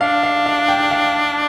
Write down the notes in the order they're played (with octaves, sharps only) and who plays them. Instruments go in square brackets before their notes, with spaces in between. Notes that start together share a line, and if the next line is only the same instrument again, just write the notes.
[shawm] D4 [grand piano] F5
[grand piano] F5
F5
G5
F5